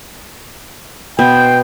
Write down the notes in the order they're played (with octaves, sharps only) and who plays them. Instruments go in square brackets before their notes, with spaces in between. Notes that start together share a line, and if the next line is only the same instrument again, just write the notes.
[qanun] B2 B3 C5 [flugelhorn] G5